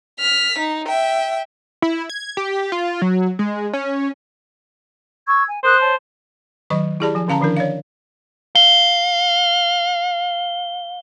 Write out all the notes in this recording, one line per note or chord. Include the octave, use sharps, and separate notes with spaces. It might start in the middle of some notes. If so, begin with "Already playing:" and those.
F6 B6
D#4
E5 G5
E4
G#6
G4
F4
F#3
G#3
C#4
C#6 E6 G#6
G#5
A#4 C5 D#6 F#6
C#5 A5
D#3 F#3 D#5 C#6
E4 G4 G#4 D5 A5 B5
F3 G#5
D3 C#4 F5 A5 A#5
D#3 F3 D4 E4 A#4
C#5 D5 F5
F5 G7